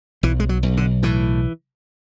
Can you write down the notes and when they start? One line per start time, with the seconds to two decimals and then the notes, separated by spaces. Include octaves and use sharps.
0.23 B1 E3
0.40 G#3
0.49 F#3
0.63 B1
0.77 D3
1.03 A2 E3